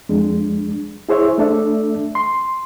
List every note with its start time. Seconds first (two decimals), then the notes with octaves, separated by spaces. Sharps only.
0.09 F2 G#3 D4
1.09 E4 G#4 C5 C#5 E5
1.38 A3 D4 A4 D5 E5
2.15 C6